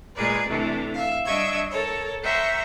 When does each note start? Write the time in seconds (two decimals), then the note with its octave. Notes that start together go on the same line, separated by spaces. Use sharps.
0.15 A#2 G#3 G#4 A#4 B4 D5
0.47 C3 E3 A3 D4 A4
0.94 E5 F5
1.25 G3 D4 D#5 E5 C#6 G#6
1.70 A4 A#4 C#5
2.23 C5 E5 F#5 G5 A#5 C#6